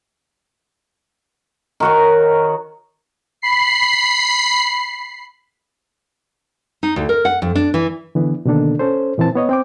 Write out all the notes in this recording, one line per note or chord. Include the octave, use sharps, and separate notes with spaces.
D#3 F#4 C#5
B5 C7
D#4
D2
A#4
F#5
F2
D4
E3
D3 E3 B3
B2 D3 D#3 A#3 D4 A4
C#4 A4 C5
A#2 E3 A#3 C4 A5
B3 C#5 D#5
C4 G5 D6